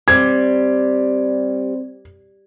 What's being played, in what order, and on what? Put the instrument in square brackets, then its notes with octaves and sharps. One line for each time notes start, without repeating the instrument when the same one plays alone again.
[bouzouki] G3 [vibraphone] C4 C5 [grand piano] G#6